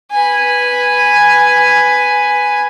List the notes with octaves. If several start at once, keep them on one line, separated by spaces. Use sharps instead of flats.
B4 G#5